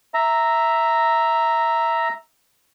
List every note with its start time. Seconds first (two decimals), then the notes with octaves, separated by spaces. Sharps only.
0.14 E5 A#5